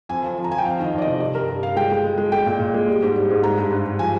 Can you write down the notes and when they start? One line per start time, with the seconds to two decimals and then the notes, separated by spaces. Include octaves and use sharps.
0.09 F2 G#5
0.23 F3
0.38 F3
0.44 A#5
0.51 F3 G#5
0.58 G5
0.65 F2 F5
0.80 D#3 D#5
0.93 F2
0.98 D5
1.02 C3 D#5
1.20 G3 D5
1.35 G2 A#4
1.48 G2
1.63 G2 F5
1.76 G#3 G5
1.91 G#3
2.04 G#3
2.18 G#3
2.32 G#3 G5
2.46 A#2
2.59 A#2
2.74 G#3
2.88 G3
3.02 G#2
3.16 G3
3.30 G#2
3.43 G#3 A#5
3.57 G2
3.71 G2
3.86 G2
3.99 F3 G#5